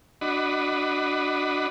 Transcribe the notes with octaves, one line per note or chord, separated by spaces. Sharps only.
D4 F#4 D#5 B5